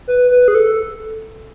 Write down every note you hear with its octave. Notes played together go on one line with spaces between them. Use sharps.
B4
B4
G#4
A4